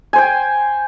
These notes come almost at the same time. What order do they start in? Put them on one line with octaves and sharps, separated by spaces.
G#5 C5 G5